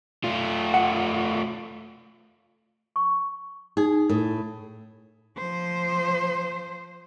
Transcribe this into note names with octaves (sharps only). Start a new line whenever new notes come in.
A3 F4
F#5
C#6
D#4 G#4
A2 A4
F3 C5